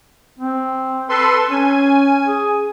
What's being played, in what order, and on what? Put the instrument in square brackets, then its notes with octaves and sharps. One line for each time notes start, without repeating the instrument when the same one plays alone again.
[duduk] C4
[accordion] A4 B4 C6
[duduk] C#4 [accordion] G#5
[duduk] G#4